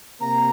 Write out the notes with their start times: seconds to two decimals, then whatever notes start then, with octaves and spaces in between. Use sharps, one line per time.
0.21 C3 A#3 A#5